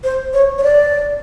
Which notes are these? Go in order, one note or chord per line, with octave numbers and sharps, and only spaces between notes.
C5
C#5
C#5
D5